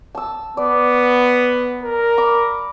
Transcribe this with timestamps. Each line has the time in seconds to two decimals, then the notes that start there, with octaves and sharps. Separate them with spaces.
0.15 A5 E6
0.57 B3 D5
1.83 A#4
2.18 B5 D6